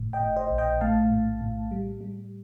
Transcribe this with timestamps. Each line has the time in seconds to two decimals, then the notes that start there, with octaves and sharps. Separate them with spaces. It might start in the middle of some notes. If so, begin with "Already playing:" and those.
Already playing: G1 A2
0.13 D#5 G5
0.20 A2
0.36 C5 D#5
0.50 A#1
0.58 D#5 G5
0.81 A3 F5 A5
1.10 A2
1.41 A2
1.71 G3
2.01 G3